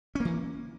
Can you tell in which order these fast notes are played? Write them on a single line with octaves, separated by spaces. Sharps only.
C#4 A#3 E3